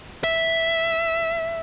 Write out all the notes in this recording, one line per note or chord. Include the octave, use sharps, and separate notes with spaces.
E5